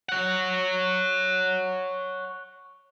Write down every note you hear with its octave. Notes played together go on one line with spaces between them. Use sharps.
C#5 F#5